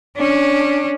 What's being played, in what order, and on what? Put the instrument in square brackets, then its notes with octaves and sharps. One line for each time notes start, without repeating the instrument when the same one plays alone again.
[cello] C#4 D4